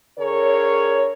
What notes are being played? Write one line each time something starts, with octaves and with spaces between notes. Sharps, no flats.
D3 G#4 A#4 C#5